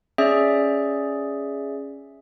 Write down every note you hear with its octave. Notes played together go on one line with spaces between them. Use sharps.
C#4 G#4 D5 E5